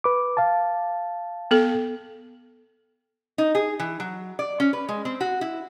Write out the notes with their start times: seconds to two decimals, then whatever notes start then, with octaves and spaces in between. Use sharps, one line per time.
0.04 B4 D6
0.37 F5 A5
1.51 B3 A4
3.38 D#4
3.55 G#4
3.79 E3
4.00 F#3
4.39 D5
4.60 C#4
4.73 B4
4.89 G#3
5.05 C4
5.21 F#4
5.41 E4